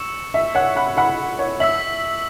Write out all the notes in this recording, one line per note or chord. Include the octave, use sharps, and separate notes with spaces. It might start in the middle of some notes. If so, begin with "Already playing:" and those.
Already playing: C#6 E6 C#7 E7
E5
C#5 F#5
F#5 B5
F#5 B5
C#5
E5 E6 B6 F#7